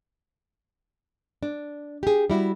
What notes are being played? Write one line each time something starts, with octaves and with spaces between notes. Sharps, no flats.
D4
G4 G#4
G3 E4 F#4